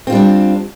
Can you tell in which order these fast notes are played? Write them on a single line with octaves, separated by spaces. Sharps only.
C4 F4 G3 D4